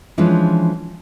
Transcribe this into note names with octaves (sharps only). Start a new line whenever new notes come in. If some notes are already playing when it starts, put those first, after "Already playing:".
E3 F3 G#3 C#4 D4